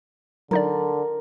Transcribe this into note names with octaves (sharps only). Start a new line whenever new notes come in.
D3 F#3 D#4 A#4 D5